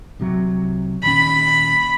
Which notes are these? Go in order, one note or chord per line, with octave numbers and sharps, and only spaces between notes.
C2 C3 F#3
D#1 D#2 C#4 B5